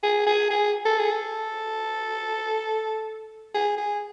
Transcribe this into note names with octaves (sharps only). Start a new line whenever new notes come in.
G#4
G#4
G#4
A4
G#4
A4
G#4
G#4